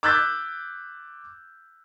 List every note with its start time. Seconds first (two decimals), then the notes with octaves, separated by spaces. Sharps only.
0.03 D6 E6 F#6 G6 A6 B6